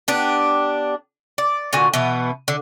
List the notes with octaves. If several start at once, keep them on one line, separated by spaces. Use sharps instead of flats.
B3 D4 G4
D5
A#2 D3 F#4 G#5
B2 E3 B3
D3